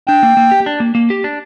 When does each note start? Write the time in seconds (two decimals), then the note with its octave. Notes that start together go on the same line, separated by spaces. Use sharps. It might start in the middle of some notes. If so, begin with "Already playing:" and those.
0.07 D4 G5
0.23 A#3
0.37 A#3
0.51 G4
0.66 D4
0.80 A#3
0.95 A#3
1.10 G4
1.24 D4